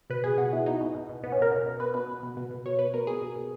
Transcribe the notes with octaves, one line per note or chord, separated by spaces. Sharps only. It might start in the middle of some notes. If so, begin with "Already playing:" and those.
B2 B4
B2 G#4
B2 F#4
B2 E4
B2 D#4
B2
B2
B2
B2 B3
C#4
B2 A#4
B2
B2
B2 B4
B2 B4
B2
B2
B2
B2
B2 C#5
B2 B4
B2 A#4
B2 G#4
B2
B2